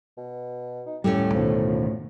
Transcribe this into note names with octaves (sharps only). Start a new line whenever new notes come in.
B2
D#4
D#1 A2 G3 A3 C#4 G4
D2 B2 D#3 F3